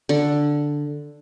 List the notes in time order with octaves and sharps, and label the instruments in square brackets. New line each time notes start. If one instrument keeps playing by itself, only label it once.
[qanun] D3